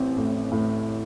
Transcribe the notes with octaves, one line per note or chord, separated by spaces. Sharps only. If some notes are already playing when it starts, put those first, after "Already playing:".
Already playing: A1 C4
A2
A2